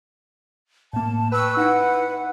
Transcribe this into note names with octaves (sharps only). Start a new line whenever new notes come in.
A2 A#3 A5
B4 G5 C#6 E6
D#4 E4 F#5